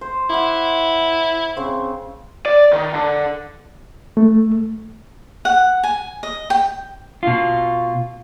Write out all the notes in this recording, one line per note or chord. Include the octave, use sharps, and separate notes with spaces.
C5
E4 F#5 D6
C#3 C4
D5
D#3
D3
A3
F#5
G#5
D#5
G5
B2 F4